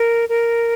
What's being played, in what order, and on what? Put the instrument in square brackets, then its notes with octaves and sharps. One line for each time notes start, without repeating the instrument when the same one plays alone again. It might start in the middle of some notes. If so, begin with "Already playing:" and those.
Already playing: [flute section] A#4
A#4